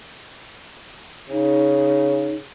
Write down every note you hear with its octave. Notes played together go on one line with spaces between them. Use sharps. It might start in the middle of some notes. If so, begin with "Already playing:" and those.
C#3 D#4